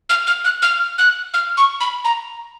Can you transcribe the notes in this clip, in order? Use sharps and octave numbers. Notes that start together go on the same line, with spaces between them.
F6
F6
F#6
F6
F#6
F6
C#6
B5
A#5